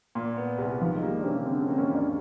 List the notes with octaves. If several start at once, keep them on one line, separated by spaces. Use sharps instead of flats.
A#2
B3
C2
D#3 F3
G#3
G3 A#3
D4
C3 C#4
C#4
D3 C4
C#4
A#3 C4
C#4
D#2 D4